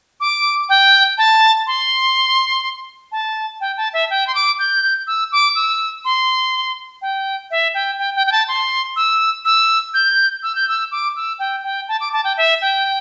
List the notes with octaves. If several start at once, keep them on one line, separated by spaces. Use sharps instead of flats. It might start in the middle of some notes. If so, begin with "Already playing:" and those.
D6
G5
A5
C6
A5
G5
A5
E5
G5
C6
D6
G6
E6
D6
E6
C6
G5
E5
G5
G5
G5
G5
A5
C6
E6
E6
G6
E6
G6
E6
D6
E6
G5
G5
A5
D6
A5
G5
E5
G5